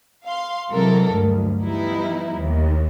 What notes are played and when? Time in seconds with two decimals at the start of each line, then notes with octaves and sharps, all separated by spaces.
0.24 F5 C6
0.71 C3 E3 F#3 G#3 A4 A#4
1.10 D2 G2
1.62 E3 F3 G3 B3 D#4 E4
2.36 D#2